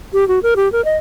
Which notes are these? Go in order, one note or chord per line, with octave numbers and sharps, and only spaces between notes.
G4
F#4
A#4
G4
A#4
D#5